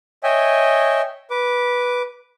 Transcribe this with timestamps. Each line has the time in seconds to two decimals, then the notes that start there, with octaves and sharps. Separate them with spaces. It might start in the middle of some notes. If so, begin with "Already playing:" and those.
0.23 C#5 D#5 E5 G5 G#5
1.30 B4 D6